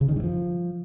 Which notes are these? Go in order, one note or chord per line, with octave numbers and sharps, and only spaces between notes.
C#3
D#3
G2
F3